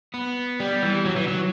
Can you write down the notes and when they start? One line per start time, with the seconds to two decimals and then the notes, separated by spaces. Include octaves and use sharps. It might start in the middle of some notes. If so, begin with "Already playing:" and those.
0.14 B3
0.60 G3
0.83 E3
1.05 F#3
1.16 E3
1.28 F#3